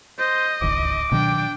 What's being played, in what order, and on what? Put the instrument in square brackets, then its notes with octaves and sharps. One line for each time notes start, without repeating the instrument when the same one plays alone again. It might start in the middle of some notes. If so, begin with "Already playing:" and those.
[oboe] C5 [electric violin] D#5
[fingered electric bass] D1 G#1 C#2 [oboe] D6
[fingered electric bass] B2 D#3 F#3 [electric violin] D4 G5